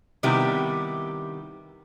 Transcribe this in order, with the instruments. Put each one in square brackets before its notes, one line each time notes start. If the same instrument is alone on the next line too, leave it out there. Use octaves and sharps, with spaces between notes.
[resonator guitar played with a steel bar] C3 D#3 G3 B3 E4 G4